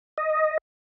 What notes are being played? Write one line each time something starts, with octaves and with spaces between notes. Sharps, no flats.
D#5